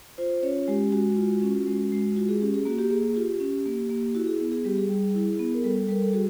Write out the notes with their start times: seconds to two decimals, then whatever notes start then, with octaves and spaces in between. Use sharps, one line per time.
0.18 F4 C5
0.43 C#4 C#5
0.68 G#3 G4
0.93 G#3 F#4
1.17 F4
1.42 C#4
1.67 G#3
1.92 G#3
2.16 F4 F#4
2.29 G#4
2.41 C#4 G4
2.54 G#4
2.65 A#3 F#4
2.78 G4
2.90 A#3 G#4
3.03 G#4
3.16 F4 G4
3.40 C#4
3.66 A#3
3.90 A#3
4.15 E4 F#4
4.27 G#4
4.40 B3
4.52 G#4
4.65 G3 G4
4.78 G#4
4.89 G3
5.15 E4
5.39 B3
5.54 A#4
5.64 G3 A4
5.88 G3 A#4
6.03 A4
6.13 F#4 G#4